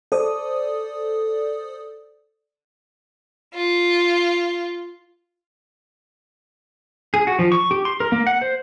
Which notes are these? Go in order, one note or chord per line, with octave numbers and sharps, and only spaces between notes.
A4 C5 D5 D#6
F4
G#4
F#4
F3
C#6
G4
C6
A#4
A#3
F#5
C5